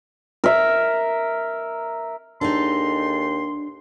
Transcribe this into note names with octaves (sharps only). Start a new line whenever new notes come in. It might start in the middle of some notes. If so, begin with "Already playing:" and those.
A#4 E5
D#2 D4 D#4 G#4 A4 C6